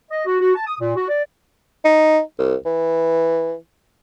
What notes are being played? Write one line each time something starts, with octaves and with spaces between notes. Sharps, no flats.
D#5
F#4
F#4
A5
D#6
A#2
F#4
D5
D#4
C2
E3